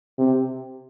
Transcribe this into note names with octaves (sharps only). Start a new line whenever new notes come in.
C3